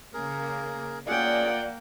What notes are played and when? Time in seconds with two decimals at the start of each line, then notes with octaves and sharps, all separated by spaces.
0.14 C#3 A#3 G#4 A#4
1.08 A#3 C#4 F4 G#4 D5 F#5 G5